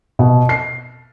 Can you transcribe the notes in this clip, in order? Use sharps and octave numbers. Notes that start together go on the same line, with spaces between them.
B2
C7